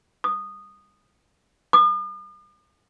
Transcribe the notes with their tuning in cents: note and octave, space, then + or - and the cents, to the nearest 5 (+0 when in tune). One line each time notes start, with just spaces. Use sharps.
D#6 -15
D#6 -45